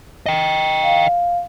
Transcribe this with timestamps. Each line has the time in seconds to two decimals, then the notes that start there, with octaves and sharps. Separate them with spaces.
0.26 D#5 G5
0.83 F5